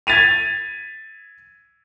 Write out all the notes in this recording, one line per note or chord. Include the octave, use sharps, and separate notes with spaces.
G#6 A6 B6 D#7 F7